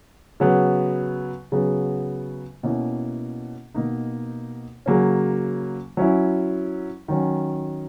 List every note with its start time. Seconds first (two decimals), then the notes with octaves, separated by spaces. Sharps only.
0.40 C#3 F#3 B3
1.52 C#3 F#3 B3
2.63 B2 A#3 C#4 E4
3.75 B2 A#3 D#4
4.86 C#3 F#3 A#3 C#4
5.97 F#3 C#4 E4
7.08 D#3 F#3 C#4